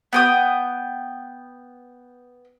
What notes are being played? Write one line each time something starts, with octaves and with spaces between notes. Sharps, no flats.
B3 G5 D#6